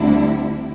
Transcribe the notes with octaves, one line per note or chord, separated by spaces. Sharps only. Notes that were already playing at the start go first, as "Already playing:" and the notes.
Already playing: D2 D3 G3 C4 E4